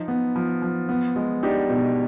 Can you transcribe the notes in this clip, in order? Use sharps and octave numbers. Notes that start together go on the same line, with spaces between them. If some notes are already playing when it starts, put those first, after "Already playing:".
Already playing: F3 D#4
B3
F3
F3
B3
G#3
D4 D#4 G4
B2